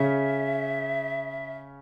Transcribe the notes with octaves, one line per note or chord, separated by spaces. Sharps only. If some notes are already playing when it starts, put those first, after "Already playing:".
Already playing: C#3 C#4 E5